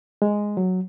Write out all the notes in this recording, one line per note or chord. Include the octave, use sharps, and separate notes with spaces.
G#3
F#3